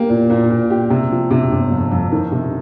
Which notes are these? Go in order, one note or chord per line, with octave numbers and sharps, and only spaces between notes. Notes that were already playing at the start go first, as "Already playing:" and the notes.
Already playing: A#3 G4
A#2
A#2
A#2
G4
C3
F3
C3
G1
F2
F2
D#3
C3